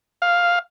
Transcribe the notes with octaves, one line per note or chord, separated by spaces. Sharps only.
F5